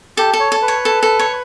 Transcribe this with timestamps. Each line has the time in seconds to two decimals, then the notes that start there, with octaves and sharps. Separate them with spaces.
0.17 G4 A4
0.33 A4
0.40 C#5
0.52 A4
0.62 B4
0.68 C#5
0.85 A4
1.03 A4
1.19 C#5